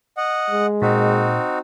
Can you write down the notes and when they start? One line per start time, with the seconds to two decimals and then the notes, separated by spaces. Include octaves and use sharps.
0.17 D#5 F#5
0.50 G#3
0.82 A#2 C4 D#4 F#4